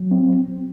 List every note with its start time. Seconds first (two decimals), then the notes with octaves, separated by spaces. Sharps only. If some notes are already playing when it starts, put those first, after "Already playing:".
Already playing: F#3
0.11 C4